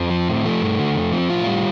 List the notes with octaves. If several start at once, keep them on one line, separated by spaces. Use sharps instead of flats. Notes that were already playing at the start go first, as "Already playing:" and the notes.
Already playing: F2 C4
F3
A2
F3 A3
G2
D3
F2
F3 C4
A2 F4
G3